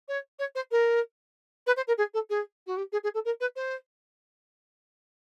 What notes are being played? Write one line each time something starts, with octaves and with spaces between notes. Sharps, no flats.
C#5
C#5
C5
A#4
B4
C5
A#4
G#4
A4
G#4
F#4
G4
G#4
G#4
A4
A#4
B4
C5